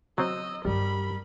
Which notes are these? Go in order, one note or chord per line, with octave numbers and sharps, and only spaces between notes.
F#3 C4 D#5 E6
G2 G3 D4 A#4 B5